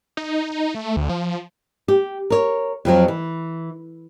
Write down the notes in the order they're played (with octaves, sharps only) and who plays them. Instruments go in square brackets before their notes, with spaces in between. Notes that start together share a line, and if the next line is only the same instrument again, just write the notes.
[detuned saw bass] D#4
A3
D2
F3
[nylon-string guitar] G4
A#4 C#5
F2 F3 F#3
E3